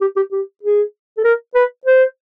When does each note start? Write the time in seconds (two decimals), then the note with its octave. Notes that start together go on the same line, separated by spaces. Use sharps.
0.01 G4
0.16 G4
0.32 G4
0.63 G#4
1.18 A4
1.24 A#4
1.55 B4
1.85 C5